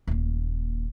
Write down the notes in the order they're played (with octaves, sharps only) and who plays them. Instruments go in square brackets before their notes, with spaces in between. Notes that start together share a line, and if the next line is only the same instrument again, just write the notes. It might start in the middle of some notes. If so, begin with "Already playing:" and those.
[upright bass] D#1 A#3